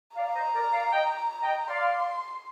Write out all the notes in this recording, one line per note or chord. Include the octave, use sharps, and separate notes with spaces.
D5 F5 A#5
C5 D#5
A#4 D5
D5 F5
D#5 G5
D#5 G5
D5 F5 C6